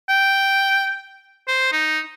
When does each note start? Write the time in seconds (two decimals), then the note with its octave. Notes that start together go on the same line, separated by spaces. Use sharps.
0.09 G5
1.48 C5
1.72 D#4